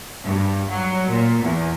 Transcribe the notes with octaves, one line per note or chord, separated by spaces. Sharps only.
G2
F#3
A#2
E2